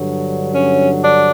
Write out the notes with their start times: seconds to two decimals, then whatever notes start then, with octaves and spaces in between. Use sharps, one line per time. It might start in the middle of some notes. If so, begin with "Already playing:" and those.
Already playing: G2 D3 F#3
0.53 C#4
1.02 D4